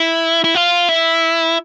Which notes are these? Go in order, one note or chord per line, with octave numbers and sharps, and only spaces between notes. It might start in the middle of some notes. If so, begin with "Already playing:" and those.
Already playing: E4
E4
F4
E4